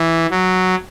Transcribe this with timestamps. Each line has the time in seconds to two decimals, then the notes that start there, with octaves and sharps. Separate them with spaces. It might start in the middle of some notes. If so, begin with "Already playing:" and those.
Already playing: E3
0.31 F#3